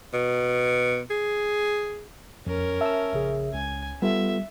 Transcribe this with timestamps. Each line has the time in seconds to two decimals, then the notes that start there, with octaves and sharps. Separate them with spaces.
0.13 B2
1.10 G#4
2.46 F2 C#4 A#4
2.81 E5 A5 E6
3.13 A#1 C#3 G#4
3.54 C#2 G#5
4.02 G3 B3 F4 A4 E5